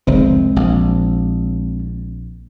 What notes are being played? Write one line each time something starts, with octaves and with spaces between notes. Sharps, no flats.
F1 C2 D#3 G#3 C4
A#1